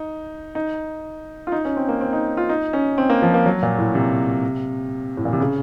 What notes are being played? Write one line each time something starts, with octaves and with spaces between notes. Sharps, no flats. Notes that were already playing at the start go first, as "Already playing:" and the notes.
Already playing: D#4
D#4
F4
D#4
C#4
C4
A#3
C4
D#4
F4
D#4
C#4
C4
A#3
F3
A#3
F#3
A#2
A2
C3
A2
A#2
C3
C#3